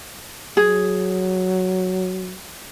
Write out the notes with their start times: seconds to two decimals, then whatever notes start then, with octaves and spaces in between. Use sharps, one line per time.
0.57 F#3 G#4